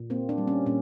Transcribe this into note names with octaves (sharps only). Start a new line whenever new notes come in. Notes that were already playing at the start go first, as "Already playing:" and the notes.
Already playing: A#2
A#3 C4
D4
G3
C#4
A#2 C#4